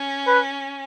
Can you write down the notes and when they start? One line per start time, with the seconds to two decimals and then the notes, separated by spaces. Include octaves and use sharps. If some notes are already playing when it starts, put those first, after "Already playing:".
Already playing: C#4
0.27 B4